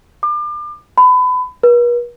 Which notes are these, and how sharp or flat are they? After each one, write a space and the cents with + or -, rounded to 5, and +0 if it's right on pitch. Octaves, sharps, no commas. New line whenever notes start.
D6 +35
B5 +30
B4 -45